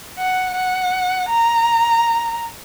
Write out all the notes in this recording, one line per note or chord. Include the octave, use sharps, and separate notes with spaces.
F#5
F#5
A#5